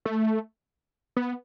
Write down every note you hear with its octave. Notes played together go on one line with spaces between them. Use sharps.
A3
B3